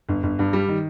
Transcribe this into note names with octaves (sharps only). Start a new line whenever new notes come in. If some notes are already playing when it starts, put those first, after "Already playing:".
G1
G1
G2
G3
D#3